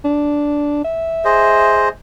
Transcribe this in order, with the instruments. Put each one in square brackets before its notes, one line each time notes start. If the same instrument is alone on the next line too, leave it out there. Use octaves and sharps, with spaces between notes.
[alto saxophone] D4
E5
[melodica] G#4 C5 D#5